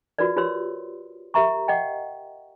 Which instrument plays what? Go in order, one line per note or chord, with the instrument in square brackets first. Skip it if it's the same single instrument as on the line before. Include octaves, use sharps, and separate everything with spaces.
[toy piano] F4 F#4 A#4 B4 D5
F4 G4 B4 C#5 C6 E6
G4 A#4 E5 A#5 C#6
D#5 F#5 G5